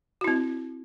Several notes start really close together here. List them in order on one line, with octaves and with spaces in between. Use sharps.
F#4 E4 C4